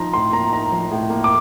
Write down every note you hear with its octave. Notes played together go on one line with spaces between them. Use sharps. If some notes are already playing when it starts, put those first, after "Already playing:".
Already playing: F3 D#4 A#5 C6
A2 C6
A#3 A#5
D#4 A#5
F3
A2
A#3
D6